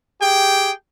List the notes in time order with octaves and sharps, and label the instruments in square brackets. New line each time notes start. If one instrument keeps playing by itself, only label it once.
[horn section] G4 G#4 G5